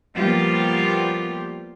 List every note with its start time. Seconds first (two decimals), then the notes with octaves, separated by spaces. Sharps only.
0.17 F3 G3 A#3 B3 F4 G4